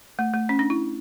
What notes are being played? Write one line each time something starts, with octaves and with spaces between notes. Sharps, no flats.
A3
A3
C#4
D4
E4